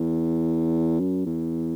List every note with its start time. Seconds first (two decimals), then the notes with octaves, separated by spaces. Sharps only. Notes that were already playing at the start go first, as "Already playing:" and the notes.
Already playing: E2
1.00 F#2
1.26 E2